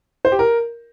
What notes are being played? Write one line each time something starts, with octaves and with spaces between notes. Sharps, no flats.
C5
G4
A#4